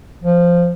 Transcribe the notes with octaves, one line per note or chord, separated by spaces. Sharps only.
F3